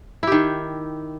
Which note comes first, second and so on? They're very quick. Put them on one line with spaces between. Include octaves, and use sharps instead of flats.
E4 G4 D#3